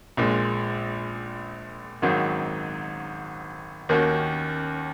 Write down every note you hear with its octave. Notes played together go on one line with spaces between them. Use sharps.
A#1 A#2 G#3
G#1 G#2 D#3 F#3
D#2 D#3 A#3 C#4 F#4